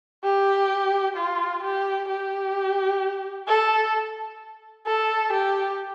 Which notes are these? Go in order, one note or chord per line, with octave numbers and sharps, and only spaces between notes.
G4
F4
G4
G4
A4
A4
G4